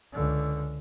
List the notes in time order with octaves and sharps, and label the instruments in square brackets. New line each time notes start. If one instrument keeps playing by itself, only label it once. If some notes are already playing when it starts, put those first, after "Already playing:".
[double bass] C#2 D3